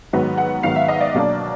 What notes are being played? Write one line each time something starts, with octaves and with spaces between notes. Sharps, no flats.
G#2 D#3 F#3 B3
F#5
G#2 D#3 F#3 B3 F5
E5
D#5
D5
B2 F#3 A#3 D4